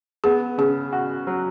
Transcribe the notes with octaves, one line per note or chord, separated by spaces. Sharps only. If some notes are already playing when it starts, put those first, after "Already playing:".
B3 G#4
C#3 G#4
F#4
F#3